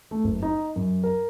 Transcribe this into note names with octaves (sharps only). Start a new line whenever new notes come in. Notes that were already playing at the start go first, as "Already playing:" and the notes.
A3
F#1
D#4
F#2
A#4